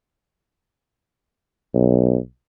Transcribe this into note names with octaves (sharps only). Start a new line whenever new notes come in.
B1